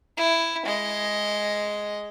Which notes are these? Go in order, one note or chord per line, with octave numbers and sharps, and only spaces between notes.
E4
G#3 D#5